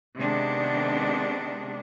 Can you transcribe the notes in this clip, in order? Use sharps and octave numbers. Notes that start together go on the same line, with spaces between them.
C3 D#3 G#3 B3 D4